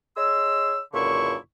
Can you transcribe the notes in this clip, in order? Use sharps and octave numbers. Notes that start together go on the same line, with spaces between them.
G#4 C#5 D#5 C6 E6
C#2 F#2 A#2 D3 E4 C#6